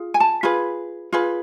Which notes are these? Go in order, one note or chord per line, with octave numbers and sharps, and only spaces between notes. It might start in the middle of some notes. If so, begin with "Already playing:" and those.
Already playing: F4 G#4
G#5
A5
F4 G#4 B4 B5
F4 G#4 B4